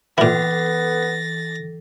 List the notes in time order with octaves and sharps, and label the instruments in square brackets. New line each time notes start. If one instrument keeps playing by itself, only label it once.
[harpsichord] A#2 E4 [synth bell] E3 A4 [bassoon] B3 [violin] A6 A#6